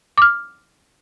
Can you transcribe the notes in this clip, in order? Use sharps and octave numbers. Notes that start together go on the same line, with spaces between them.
D6 F6